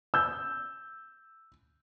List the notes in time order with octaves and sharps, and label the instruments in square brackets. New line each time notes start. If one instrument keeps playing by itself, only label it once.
[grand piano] E6 G6